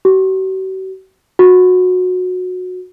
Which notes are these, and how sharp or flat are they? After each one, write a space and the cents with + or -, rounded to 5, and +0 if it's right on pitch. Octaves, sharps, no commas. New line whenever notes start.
F#4 +45
F#4 -20